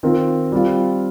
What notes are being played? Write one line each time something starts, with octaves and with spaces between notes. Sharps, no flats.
D#3 C4 F4 A#4
G3 C4 F4